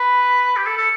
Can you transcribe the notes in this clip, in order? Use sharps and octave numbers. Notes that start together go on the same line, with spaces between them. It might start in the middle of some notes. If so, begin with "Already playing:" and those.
Already playing: B4
G4
A4
A4